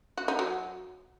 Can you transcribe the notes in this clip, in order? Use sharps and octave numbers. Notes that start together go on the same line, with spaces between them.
F#4
D#4
F#3